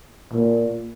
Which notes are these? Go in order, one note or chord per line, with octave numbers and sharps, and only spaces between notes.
A#2